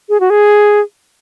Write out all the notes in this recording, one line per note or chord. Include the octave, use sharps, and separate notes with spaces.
G#4
F#4
G#4